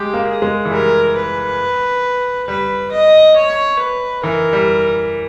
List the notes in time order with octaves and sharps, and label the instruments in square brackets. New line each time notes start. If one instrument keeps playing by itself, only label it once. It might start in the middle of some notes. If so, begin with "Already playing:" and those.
Already playing: [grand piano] G#3 [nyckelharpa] G4
[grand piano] A#3
[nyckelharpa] G#4
[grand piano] G#3
E3
[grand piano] G3 [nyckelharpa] A#4
[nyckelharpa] B4
[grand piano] G3 [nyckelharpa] B4
[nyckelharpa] D#5
C#5
B4
[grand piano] E3 [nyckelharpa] A#4
[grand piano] G3